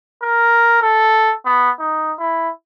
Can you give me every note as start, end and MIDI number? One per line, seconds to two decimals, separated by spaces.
0.23 0.79 70
0.82 1.35 69
1.45 1.71 59
1.79 2.13 63
2.19 2.50 64